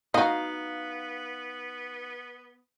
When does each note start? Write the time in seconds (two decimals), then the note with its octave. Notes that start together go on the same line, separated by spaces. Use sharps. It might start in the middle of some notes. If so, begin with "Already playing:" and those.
0.14 B3 D#4 F#4 D#5 F5